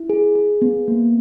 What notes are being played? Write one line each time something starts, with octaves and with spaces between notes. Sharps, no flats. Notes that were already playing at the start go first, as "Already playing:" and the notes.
Already playing: E4
G#4
G#4
B3
A#3